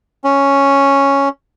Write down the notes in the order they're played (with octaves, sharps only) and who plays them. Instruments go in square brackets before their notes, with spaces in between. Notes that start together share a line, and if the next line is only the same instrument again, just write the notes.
[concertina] C#4